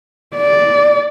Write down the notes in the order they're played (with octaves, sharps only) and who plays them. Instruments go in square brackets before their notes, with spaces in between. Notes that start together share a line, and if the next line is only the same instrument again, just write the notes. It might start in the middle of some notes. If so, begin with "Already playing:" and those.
[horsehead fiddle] D5